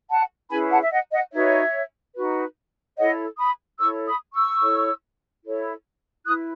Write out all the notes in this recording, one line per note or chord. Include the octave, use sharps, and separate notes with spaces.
F#5 A5
C#4 E4 G#4 B4 G#5 B5
F#5 A5
E5
D#5 F#5
D#5 F#5
D#4 F#4 B4 C#5 E5
D#4 F#4 B4
E4 A4 C#5 D#5 F#5
B5 D#6
E4 A4 C#5 C#6 E6
B5 D#6
C#6 E6
E4 A4 C#5
E4 A4 C#5
E4 B4 D#6 F#6